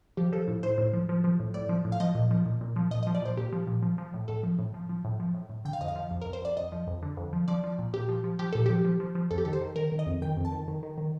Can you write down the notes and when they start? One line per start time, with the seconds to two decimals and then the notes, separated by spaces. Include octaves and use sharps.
0.17 F3 G4
0.32 F3 A4
0.48 A2
0.63 A2 C5
0.78 A2
0.93 F3
1.09 F3
1.24 F3
1.40 A2
1.54 A2 D5
1.69 F3
1.85 A2
1.92 F5
2.00 F3 D#5
2.15 A#2
2.31 F3
2.46 A#2
2.61 A#2
2.76 F3
2.91 A#2 D#5
3.03 D#5
3.07 F3
3.15 D5
3.22 A#2 C5
3.37 A#2 G4
3.53 F3
3.67 A#2
3.83 F3
3.98 F3
4.14 A2
4.28 A2 A4
4.43 F3
4.59 A2
4.74 F3
4.89 F3
5.05 A2
5.20 F3
5.35 A2
5.50 A2
5.65 D3 G5
5.73 F5
5.81 F2 D#5
5.88 F5
5.96 F3
6.11 F2
6.22 F2 A#4
6.33 C5
6.42 F2 D5
6.57 F2 D#5
6.72 F3
6.87 F2
7.02 D3
7.17 F2
7.33 F3
7.48 F3 D5
7.64 F3
7.79 A#2
7.93 A#2 G4
8.09 F3
8.24 F3
8.39 F3 G4
8.53 A#2 A4
8.66 F3 G4
8.85 F3
9.00 F3
9.15 F3
9.31 F2 A4
9.38 G4
9.45 D#3 A4
9.53 C5
9.61 D#3
9.76 D#3 A#4
9.92 D#3
9.99 D#5
10.06 F2
10.22 D#3 G5
10.37 F2
10.45 A5
10.52 D#3
10.68 D#3
10.83 D#3
10.98 D#3